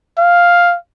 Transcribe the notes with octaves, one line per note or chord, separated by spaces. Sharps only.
F5